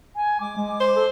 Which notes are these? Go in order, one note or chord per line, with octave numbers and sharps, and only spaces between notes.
G#5
G#3 D6
G#3
C5
A4